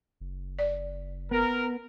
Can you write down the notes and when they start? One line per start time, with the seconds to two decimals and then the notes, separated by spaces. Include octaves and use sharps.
0.21 F#1
0.59 D5
1.31 B3 A#4